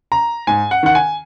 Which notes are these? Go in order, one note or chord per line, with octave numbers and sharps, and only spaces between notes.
A#5
G#2 G#5
F#5
D#3 F#5
G#5